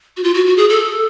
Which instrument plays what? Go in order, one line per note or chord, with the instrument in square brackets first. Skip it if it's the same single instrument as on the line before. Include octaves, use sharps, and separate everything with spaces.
[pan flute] F#4
F4
F#4
F#4
G#4
A4